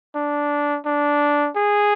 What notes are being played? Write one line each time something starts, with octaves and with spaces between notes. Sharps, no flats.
D4
D4
G#4